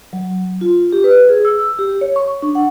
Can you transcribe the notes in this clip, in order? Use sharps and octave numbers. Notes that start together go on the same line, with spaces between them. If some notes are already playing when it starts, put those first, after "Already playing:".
F#3
F4
G4
B4
G#4
E6
G4
C#5
C#6
D4
F#5